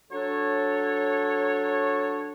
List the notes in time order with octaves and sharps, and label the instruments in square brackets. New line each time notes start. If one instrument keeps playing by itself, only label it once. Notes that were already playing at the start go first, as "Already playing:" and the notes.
[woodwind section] F#3 D4 A4 C#5